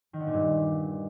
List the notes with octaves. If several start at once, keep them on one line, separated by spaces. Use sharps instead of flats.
D#3
D3
A#2
G2